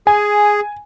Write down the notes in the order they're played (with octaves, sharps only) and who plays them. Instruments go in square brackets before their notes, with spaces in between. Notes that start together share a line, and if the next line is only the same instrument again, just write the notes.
[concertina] G#4 [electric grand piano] G#5